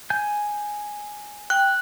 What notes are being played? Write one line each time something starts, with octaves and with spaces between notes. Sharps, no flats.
G#5 G6
G5 F#6